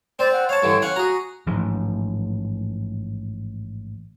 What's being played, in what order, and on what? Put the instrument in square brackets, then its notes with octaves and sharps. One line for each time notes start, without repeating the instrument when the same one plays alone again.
[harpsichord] C4 C5 [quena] D5
[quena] F#5
[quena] C#5 [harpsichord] F5 A5
[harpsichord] G2 D3 E3
C#4 F5 F#5
[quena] F#4 [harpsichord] G#4 A#5
[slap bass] A1 G#2 F3